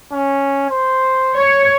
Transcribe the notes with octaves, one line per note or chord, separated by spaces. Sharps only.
C#4
C5
C#5